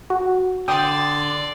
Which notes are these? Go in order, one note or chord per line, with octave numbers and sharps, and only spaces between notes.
F#4
D3 D5 G5 C6 D#6